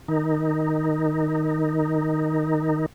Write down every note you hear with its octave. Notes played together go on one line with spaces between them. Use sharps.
D#3 D#4